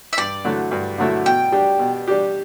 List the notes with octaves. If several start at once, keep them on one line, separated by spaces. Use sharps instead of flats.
E5
G2 D5
D3 F#3 A3 E4
G2
D3 F#3 A3 E4
B2 G5
G3 D4 G4
B2
G3 D4 G4